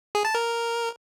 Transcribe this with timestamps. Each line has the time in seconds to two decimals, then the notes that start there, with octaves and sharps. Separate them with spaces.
0.15 G#4
0.25 A5
0.35 A#4